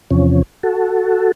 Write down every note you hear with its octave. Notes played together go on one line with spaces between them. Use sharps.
E2 C3 F3 C#4
F#4 A4